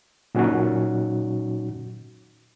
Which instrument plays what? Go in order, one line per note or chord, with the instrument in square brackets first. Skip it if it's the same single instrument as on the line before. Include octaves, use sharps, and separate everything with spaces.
[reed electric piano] A#2 F#3 C#4 D#4 F#4